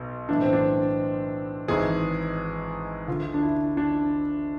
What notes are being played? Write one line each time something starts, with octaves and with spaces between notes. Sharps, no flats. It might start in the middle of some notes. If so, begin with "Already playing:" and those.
Already playing: B1 B2
B1 A2 E3 D4
C4
D4
G#1 G#2 E3 G#4
D2 D3 F4
D4
E4
D4